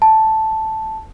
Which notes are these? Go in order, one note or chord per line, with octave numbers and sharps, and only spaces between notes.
A5